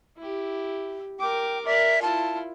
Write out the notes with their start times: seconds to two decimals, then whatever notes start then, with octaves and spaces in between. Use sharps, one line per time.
0.17 E4 G4
1.19 A#4 G5 D6
1.65 A#4 D5 E5
2.02 E4 F4 A5